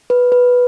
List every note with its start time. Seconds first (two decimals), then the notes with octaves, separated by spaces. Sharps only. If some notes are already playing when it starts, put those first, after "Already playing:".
0.10 B4
0.32 B4